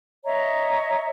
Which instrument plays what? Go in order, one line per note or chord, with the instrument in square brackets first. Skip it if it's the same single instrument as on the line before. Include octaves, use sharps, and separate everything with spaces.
[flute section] C#5 D#5 E5 A#5